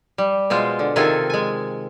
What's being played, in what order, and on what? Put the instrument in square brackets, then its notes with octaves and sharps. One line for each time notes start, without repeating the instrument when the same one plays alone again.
[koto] G3
B2 G#3 F4 C5
D3
C3 D#3 F4 G#4 A4 G#5
G#3 G#5